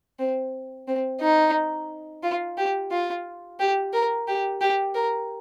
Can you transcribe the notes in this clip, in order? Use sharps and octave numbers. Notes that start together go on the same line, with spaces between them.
C4
C4
D#4
F4
G4
F4
G4
A#4
G4
G4
A#4